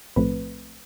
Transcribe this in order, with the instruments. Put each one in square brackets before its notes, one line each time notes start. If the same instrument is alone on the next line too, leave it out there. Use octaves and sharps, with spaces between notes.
[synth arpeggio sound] B1 A2 F3 A3 C4 B4